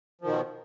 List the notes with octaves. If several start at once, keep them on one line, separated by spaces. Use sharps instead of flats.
B2 D#3 F3